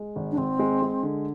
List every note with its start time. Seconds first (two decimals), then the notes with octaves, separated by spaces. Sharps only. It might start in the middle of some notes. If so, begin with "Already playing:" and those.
Already playing: G#3
0.16 G#1
0.31 D4
0.37 G#1 C4
0.59 G#3
0.82 G#3
1.03 D3